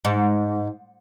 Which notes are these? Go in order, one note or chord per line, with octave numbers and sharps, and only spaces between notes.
G#2